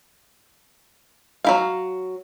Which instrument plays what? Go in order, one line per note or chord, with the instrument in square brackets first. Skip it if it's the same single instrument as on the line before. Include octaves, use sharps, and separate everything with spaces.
[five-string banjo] F#3 E4 F5